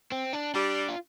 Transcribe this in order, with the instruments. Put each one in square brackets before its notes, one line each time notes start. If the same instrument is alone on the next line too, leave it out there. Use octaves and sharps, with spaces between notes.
[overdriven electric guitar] C4
D4
[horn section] G3 [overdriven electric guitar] D4
[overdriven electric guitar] F4